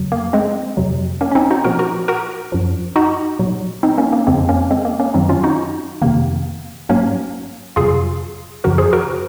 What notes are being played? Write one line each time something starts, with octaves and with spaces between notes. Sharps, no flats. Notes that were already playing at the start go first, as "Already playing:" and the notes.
Already playing: F2 C#3 F#3
A#3
G#3 C4
F2 C3 F#3
A#3 C#4
C#4
C4 D#4
D#4 F#4
A#2 F3 F#4 A#4
F#4 A#4
F#4 A#4
F#2 F3
D#4 F#4
A#2 F#3
C4 D#4
A#3 C#4
A#3
F2 C#3 F3 G#3 C4
A#3 C#4
G#3 C4
A#3
A#3 C#4
F#2 D#3 F#3 C4 D#4
C#4 F4
D#4 F#4
F2 C3 D#3 A#3
G#2 F#3 A#3 C#4
F2 C3 F#3 F4 G#4
F#2 C#3 F3 F#4 A#4
G#4 C5
F#4 A#4